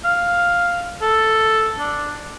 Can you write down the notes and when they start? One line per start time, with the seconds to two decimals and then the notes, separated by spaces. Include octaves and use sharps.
0.04 F5
1.02 A4
1.79 D4